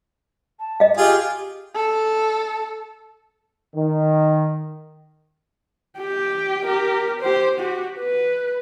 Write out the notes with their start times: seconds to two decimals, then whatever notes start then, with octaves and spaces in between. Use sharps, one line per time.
0.59 A5
0.80 D#5 F5
0.97 F4 G4 G#4
1.75 A4
3.75 D#3
5.98 G4 G5
6.66 G4 A#4
7.21 G4 C5
7.59 F#4 G4
8.00 B4